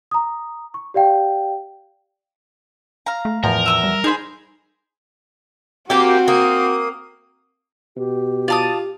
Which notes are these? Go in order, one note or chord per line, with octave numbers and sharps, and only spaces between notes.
A#5 D#6
C#6
G4 D5 F5 G5
F5 A#5
A3
E2 A2 F3 A#4
E5 D#6 E6
G3
D#4 G#4 C5 B5
A#3 C4 F#4 G4 G5
A#3 D#6
B2 G4
F4 D5 A5 D#6